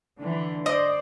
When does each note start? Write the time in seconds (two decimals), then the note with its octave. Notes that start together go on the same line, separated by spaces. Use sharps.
0.19 D3 E3
0.66 C5 D5 D#5